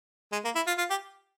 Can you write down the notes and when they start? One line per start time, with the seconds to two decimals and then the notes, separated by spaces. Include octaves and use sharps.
0.32 G#3
0.45 A#3
0.55 E4
0.67 F4
0.78 F4
0.90 G4